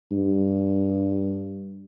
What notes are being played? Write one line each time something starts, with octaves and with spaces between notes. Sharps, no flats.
G2